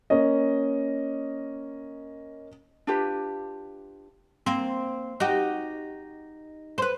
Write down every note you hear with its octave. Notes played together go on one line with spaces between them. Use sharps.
A#3 C#4 D#5
D4 F4 G4 B4
A#3 C4
D#4 F#4 G4
B4 C5